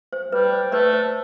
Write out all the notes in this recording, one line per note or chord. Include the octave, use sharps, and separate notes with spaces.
C5
G3 B4
C5
A3 B4 D5
C5